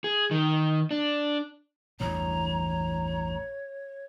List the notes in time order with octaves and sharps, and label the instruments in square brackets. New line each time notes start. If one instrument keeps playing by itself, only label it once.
[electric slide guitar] G#4
D#3
D4
[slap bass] A1 E2 G2 [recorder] C#5 [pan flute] A#5